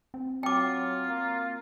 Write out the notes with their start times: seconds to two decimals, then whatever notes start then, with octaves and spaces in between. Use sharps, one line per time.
0.14 C4
0.43 F#3 F4 G5 D6
1.09 A#3